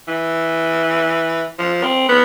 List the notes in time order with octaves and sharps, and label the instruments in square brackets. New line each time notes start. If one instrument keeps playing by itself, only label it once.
[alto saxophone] E3
F3
C4
B3